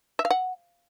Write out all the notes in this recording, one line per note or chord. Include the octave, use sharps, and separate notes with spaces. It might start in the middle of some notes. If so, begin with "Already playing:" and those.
E5
F5
F#5